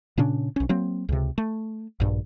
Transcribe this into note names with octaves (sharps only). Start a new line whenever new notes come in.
A#2 C#3 C#4 D4
B1 C#4
F#3 A#3 C4
C#2 C3
A3
A#1 G2